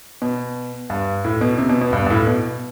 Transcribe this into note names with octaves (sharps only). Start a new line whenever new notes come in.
B2
G2
A2
B2
C3
B2
B2
G2
G2
A2
B2